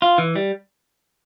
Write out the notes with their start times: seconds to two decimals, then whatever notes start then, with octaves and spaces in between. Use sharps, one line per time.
0.02 F4
0.18 E3
0.36 G3